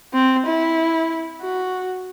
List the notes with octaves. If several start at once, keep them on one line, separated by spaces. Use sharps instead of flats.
C4
E4
F#4